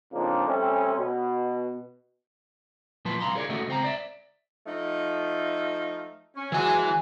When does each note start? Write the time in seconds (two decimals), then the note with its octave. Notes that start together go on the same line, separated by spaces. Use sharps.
0.13 F2 C#3 F3 A#3 D4 D#4
0.47 G3 A3 C4 C#4
0.98 B2
3.05 A#2 F3 F#3 B4 A5 C6
3.20 C2 G#2 F5 A#5 C6
3.35 G#4 A#4 C#5 D5
3.50 A3 C#4 F#4 D#5 E5
3.68 C#2 C4 A#5
3.84 D5 E5
4.66 F3 A3 D#4
6.36 C#4
6.52 E3 F#3 G#3 G#5